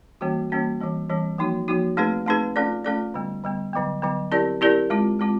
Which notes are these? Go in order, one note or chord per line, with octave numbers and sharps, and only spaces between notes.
E3 G3 A#3 C#4 F#4
E3 G3 A#3 C#4 F#4
E3 G3 C4
E3 G3 C4
F3 A#3 D#4 F#4
F3 A#3 D#4 F#4
A3 C4 D#4 G#4 B4
A3 C4 D#4 G#4 B4
A3 C#4 F4 A4 D5
A3 C#4 F4 A4 D5
D3 G3 B3
D3 G3 B3
D3 F#3 B3
D3 F#3 B3
C4 E4 G4 A#4 D5
C4 E4 G4 A#4 D5
G#3 C4 F4
G#3 C4 F4